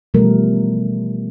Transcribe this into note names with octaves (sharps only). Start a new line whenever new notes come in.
B2 E3 F3 G3 A3 A#4